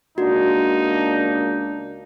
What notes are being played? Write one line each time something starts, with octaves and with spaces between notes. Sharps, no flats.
C#2 A#3 D4 D#4 F#4